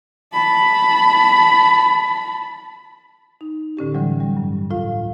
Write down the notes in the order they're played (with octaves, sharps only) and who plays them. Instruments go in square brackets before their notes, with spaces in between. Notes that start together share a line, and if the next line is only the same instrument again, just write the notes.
[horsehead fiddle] A5 B5
[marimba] D#4
A2 D3 C#4 G4
A2 D3 E3 F#3 G3
G3
G2
D2 A2 F4 F5